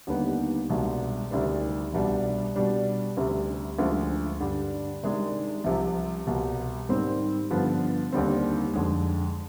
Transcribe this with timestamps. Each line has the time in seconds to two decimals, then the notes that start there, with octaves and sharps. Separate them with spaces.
0.07 D#2 D3 G3 B3 D#4
0.70 C2 B2 G#3 D4
1.31 D2 C3 D#3 G3 D4
1.93 C2 B2 G3 D4
2.56 B2 G3 D4
3.17 D2 C3 G3
3.79 D2 D3 F3 G#3
4.40 G2 D3 G3 D4
5.03 C3 D#3 G#3 D4
5.64 C2 C3 F3
6.27 C2 B2 G3
6.88 G#2 D#3 G3 C4
7.51 G2 D3 F3 B3
8.13 D#2 D3 G3 C4
8.73 F2 D3 G#3